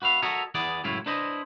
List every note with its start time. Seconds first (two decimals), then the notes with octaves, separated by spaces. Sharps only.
0.02 F#4 B4 E5 F5
0.22 F#4 A4 A#4 C#5 D#5 E5
0.55 E2 E3 B3 G#4 D5
0.84 C#2 F#2 A2 E4 F4 C#5
1.06 D4 E4 B4 C5 D#5